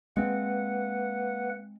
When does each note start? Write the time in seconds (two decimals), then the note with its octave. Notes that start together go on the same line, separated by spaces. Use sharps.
0.17 G#3 A#3 C4 B4 F#5